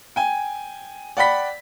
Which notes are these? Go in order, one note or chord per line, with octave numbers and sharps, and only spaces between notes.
G5 G#5
D5 F#5 G5 B5 B6